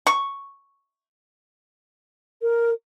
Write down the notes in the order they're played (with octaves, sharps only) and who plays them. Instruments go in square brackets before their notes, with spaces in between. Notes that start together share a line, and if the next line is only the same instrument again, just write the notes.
[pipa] C#6
[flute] A#4